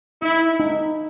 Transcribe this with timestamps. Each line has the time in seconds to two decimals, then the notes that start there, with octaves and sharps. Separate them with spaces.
0.22 D#4 E4
0.60 D#4